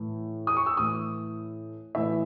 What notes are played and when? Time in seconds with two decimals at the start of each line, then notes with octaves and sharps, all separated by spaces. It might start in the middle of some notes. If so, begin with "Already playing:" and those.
Already playing: A2 E3
0.47 D#6
0.57 C#6
0.66 E6
0.77 A2 E3 D#6
1.95 A2 E3 E5